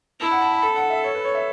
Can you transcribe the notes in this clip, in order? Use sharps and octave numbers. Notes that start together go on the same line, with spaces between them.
E4 A5
F#5
A5
B5
A4 A5
F#5
E5
C#5
B4
C#5
E5